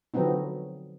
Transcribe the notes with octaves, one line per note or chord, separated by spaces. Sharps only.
D3 F3 F#3 B3 C4 D#4